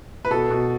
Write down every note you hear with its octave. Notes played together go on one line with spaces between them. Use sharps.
B4
B2 A4
B2